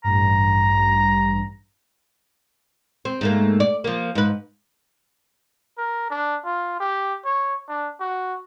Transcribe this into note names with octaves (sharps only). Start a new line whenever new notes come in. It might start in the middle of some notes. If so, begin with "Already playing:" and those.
A1 G2 A#5
C4
G#2 A3 A#3
D5
F3 A#3
G#2 B4
A#4
D4
F4
G4
C#5
D4
F#4